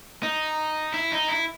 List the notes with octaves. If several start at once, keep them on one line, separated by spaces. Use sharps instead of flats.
D#4
E4
D#4
E4